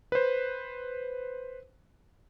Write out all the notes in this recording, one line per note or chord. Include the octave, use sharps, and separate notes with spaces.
B4 C5